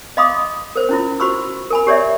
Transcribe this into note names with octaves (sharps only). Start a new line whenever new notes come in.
D#5 F5 B5 C6 D6 D#6
A#4 C5
C#4 E4 F4
F#4 C5 B5 C#6 E6
A#4 G#5 B5
G4 C#5 D5 E5